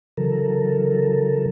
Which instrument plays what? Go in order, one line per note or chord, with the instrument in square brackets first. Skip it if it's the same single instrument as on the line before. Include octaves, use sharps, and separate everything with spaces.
[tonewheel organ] C#3 E3 F#3 A4 A#4